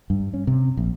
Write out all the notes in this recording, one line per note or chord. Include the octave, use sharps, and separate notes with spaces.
G2
C#4
C3
A#1